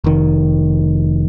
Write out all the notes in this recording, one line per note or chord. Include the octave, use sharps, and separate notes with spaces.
F1 D#3